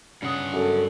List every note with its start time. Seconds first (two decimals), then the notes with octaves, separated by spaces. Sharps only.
0.22 G2 C#3 F#5 D#6
0.53 F#2 A4